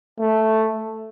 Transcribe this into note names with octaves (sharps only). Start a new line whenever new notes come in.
A3